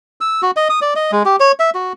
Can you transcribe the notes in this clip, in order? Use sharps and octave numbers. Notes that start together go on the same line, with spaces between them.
E6
F#4
D#5
D#6
D5
D#5
G#3
G4
C#5
E5
F#4